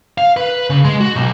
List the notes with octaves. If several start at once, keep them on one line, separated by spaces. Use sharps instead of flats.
F5
B4
C#3
G#3
F#4
B1